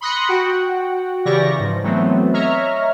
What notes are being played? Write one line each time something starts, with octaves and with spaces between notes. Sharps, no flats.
B5 C6 D#6 F#6 A#6 C#7
F#4 F#5 G5
C#3 E3 G4 D5 C#6 A#6
G#2 F3
E3 F#3 A3 B3 C4
C#5 D#5 E5 A#5 C#6 F6